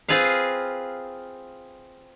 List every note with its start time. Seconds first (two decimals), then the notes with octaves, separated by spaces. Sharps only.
0.09 C4 F4 G#4 B4 F5